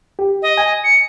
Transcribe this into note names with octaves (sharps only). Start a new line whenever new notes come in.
G4
D#5
G#5
C#7